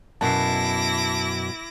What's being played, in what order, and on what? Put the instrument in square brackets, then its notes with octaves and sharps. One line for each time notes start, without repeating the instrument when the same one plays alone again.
[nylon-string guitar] F#2 B2 [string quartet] E4 D6 A#6 [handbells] A5 C7